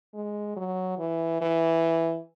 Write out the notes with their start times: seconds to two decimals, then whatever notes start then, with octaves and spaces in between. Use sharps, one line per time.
0.14 G#3
0.57 F#3
0.99 E3
1.41 E3